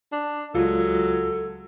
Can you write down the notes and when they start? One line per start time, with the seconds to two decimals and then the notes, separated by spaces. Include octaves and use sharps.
0.12 D4
0.54 C#2 F#3 G#3 F4 A4